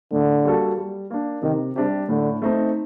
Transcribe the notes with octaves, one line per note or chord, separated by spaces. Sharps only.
A2 D3
G3 A#3 F#4 A4
G3
A#3 D4
C3 D#3
C3 G3 D4 G4
A2 D3
A3 C4 D#4